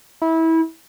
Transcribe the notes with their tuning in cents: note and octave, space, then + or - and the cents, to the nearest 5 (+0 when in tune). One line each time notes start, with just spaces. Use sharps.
E4 -25